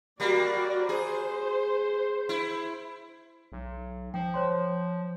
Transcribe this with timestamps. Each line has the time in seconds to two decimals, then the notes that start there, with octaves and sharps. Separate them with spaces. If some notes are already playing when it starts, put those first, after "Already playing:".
0.20 G3 A#3 F#4 D5
0.89 G#4 C5
2.29 E4
3.52 B1
4.14 F3 G5
4.34 C5 C#5 C6